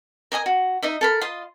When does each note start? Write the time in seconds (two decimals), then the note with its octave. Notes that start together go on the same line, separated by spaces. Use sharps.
0.32 A#4 D#5 G#5 D#6
0.46 F#4
0.83 D#4 D#5 E5
1.01 A4 A#4 B5
1.21 F4 D#5 C6